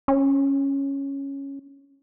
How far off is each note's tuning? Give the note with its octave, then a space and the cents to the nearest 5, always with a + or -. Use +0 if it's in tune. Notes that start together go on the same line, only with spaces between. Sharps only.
C#4 -5